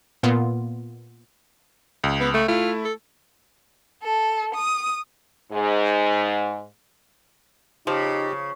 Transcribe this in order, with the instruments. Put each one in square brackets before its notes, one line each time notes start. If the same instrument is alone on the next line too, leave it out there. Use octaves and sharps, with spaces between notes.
[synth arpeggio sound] A#2 A#3 B3 F4
[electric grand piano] C#2
[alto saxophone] B3
A3
[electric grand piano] A3 E4 [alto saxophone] F4
[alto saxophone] A4
[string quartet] A4
D#6
[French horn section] G#2
[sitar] C#3 [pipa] F3 [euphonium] D#4 [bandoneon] G4